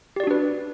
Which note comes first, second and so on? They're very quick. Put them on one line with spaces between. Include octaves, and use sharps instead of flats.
G4 D5 F#4 D4 B4